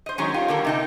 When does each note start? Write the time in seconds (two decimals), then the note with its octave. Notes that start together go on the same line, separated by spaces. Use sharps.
0.06 C5 D#5
0.18 D#3 F#3 G#3 C#4
0.34 F4 G4
0.48 D3 A#3 A4 A#4
0.65 C3 D#4 G5